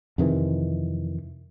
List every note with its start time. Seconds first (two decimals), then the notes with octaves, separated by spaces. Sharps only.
0.18 F2 C3 D#3 E3